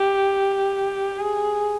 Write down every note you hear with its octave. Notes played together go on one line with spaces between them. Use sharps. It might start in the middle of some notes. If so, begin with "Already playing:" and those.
Already playing: G4
G#4